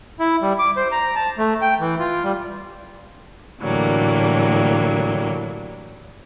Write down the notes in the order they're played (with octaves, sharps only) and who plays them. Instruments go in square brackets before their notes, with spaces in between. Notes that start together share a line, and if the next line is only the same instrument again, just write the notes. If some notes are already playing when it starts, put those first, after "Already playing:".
[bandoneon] E4
G3
D6
C5
A#5
A5
A3
G5
E3
F4
G3
[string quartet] A2 D3 E3 F#3 G3 A#3